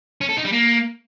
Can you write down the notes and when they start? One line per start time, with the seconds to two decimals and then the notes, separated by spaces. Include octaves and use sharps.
0.21 C#4
0.29 A4
0.37 D#4
0.45 G3
0.53 A#3